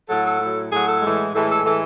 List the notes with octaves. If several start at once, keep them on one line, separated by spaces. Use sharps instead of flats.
A2 F#3 A4
A4
A2 F#3
A2 F#3 G#4
A4
A2 E3 G#3
A2 E3 G#3 A4
A4
A2 E3 G#3 A4